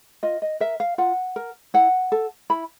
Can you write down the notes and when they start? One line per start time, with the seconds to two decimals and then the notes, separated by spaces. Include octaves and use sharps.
0.23 F4 D#5
0.42 D#5
0.60 A#4 E5
0.80 F5
0.98 F4 F#5
1.36 A#4
1.74 E4 F#5
2.12 A4
2.50 E4 B5